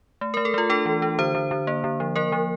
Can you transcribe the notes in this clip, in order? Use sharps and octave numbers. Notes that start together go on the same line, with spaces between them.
A3
A3 A#4
A4
A3 F4
D4 A4
E3
D4
D3 C5
D3
D3
A#3
D3
F3
A#3 A#4
F3